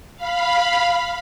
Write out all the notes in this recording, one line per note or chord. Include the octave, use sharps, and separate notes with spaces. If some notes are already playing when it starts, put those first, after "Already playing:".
F5 B5